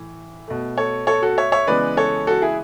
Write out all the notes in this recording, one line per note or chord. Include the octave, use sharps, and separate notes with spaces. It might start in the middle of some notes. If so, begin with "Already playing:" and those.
Already playing: A2 E3
B2 A3
A4 C#5
A4 C#5
F#4 A4
C#5 E5
C#5 E5
C#3 E3 G#3 B3 B4 D5
A4 C#5
F#4 A4
E4 G#4